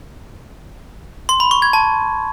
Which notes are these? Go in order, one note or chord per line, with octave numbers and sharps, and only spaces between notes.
C6
B5
C#6
G#6
A5